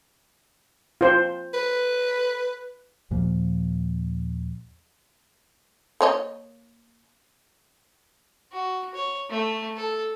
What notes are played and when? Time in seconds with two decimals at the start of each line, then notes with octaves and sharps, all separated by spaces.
1.01 F4 C5
1.54 B4
3.10 D#2 A#2 F3 A#3
6.01 A#3 C#5 D#5
8.52 F#4
8.95 C#5
9.30 A3
9.77 A4